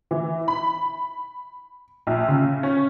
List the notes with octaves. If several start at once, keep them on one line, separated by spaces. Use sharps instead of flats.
E3
B5
A#1
C#3
C#4